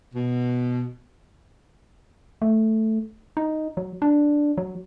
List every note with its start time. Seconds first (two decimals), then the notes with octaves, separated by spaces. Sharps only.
0.14 B2
2.42 A3
3.37 D#4
3.77 F#3
4.02 D4
4.58 F#3